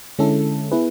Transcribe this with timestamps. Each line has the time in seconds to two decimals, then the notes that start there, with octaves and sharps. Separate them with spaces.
0.19 D3 G#3 C#4 E4 A4
0.72 B3 E4 G#4 B4